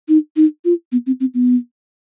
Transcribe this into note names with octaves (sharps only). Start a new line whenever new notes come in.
D#4
D#4
F4
B3
C4
C4
B3